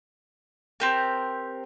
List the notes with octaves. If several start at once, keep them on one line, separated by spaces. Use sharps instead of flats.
C4 G4 A#4